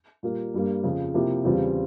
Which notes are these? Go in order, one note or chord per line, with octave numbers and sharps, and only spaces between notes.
A#2 G3 A#3
G2 G3 A#3
F2 C#3 F3
C3 F3 A#3 E4 G4
E2 C#3 G3 C4 F4